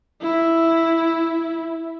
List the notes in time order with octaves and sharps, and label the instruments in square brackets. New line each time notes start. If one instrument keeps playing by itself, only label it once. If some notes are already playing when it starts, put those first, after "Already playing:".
[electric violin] E4